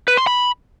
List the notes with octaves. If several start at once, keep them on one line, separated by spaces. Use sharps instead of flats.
B4
C6
B5